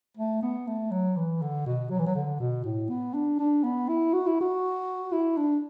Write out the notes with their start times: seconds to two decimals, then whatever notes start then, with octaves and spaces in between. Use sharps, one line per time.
0.18 A3
0.42 B3
0.67 A3
0.91 F#3
1.16 E3
1.42 D3
1.66 B2
1.90 F#3
1.99 E3
2.06 F#3
2.15 D3
2.40 B2
2.65 A2
2.90 B3
3.14 D4
3.39 D4
3.64 B3
3.89 E4
4.13 F#4
4.27 E4
4.41 F#4
5.12 E4
5.37 D4